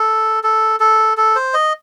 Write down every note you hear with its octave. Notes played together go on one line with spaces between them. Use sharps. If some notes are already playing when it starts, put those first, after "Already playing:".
Already playing: A4
A4
A4
A4
C5
D#5